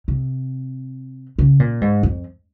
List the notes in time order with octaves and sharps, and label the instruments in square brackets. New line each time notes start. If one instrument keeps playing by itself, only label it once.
[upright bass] C3
C#3
A#2
G#2
F2